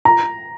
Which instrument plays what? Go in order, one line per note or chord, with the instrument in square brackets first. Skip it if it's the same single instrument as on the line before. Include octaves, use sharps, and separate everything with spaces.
[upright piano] A#5